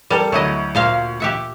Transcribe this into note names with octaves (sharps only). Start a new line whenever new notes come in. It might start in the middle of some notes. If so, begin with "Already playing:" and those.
G3 A4 A#4
D2 F#3 E4 D#5
A#2 C5 F5
G4 E5 F#5